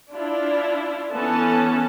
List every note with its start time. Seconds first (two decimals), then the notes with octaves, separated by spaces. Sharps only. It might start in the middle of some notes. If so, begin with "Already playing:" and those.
0.12 D4 E4 F4
1.11 E3 B3 C#4 A4 A5